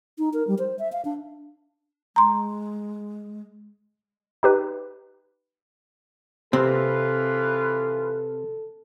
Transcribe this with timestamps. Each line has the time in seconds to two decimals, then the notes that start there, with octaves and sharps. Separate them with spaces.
0.18 D#4
0.34 A#4
0.47 G3
0.59 C5
0.79 E5
0.92 F5
1.05 D4
2.16 G#3 A#5 C6
4.43 D#4 G4 B4
6.53 C3 E3 C4 F4 A4 B4